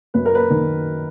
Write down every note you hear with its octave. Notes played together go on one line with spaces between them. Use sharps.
F#2 B4
A#4
B4
D#3